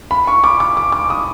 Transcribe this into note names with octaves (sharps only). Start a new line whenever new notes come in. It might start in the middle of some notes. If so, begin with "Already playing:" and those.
B5
C#6
D6
D6
D6
D6
D#6